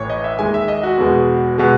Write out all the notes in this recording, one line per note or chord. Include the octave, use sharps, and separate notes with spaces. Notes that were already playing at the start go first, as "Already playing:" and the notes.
Already playing: A1 A2 E3 C#5
D#5
E5
D#2 D#3 G#3 G#5
E5
D#5
F#4
E2 B2 G#3
B2 G#3